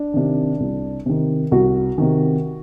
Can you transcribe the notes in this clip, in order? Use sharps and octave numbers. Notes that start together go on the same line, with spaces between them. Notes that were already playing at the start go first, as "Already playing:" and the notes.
Already playing: D4
C3 D#3
C2
C3 D#3
C2 F#4
C3 D#3